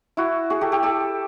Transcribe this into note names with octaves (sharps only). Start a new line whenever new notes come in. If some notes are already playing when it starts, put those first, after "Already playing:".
E4 F#4
F#4 G#4
G4 A4
G4 A4
G4 A4